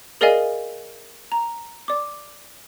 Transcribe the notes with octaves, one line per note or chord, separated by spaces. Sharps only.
G#4 A#4 D5 D#5 F5 G#5
A#5
D5 D6